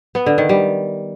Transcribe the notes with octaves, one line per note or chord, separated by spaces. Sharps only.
B3
D3
D#3
G3